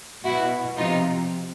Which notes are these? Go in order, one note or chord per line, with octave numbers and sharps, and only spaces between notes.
B2 E4 F#4
C3 F3 D#4 F4